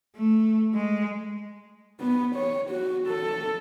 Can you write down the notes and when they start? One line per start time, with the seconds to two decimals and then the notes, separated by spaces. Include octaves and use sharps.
0.16 A3
0.74 G#3
2.01 B3
2.36 C#5
2.70 F#4
3.08 A4